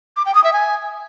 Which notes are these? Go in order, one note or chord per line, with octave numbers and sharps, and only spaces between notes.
D6
G5
D#6
E5
G#5